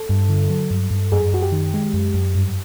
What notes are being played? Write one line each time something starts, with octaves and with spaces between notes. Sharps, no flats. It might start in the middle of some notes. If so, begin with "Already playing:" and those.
Already playing: A4
G2
D3
F#3
G2
G2
F#2 G#4
F#2 F#4
G4
D#3
G#3
F#2
F#2
G2